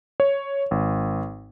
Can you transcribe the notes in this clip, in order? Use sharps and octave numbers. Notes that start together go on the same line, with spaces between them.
C#5
G#1